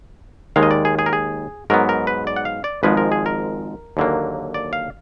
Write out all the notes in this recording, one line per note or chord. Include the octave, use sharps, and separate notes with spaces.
D#2 D#3 G#3 F5
D#5
D5
G#4
G#4
A#4
G#4
G#2 F#3 B3 A#4
A#4
B4
D5
F#5
F5
D5
G#1 G#2 F3 G#3 B4
A#4
G#4
A#4
D#2 D3 F#3 A#3
D5
F5